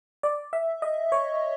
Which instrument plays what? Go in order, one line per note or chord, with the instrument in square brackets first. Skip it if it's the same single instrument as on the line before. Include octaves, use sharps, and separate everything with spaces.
[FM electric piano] D5
E5
D#5
C#5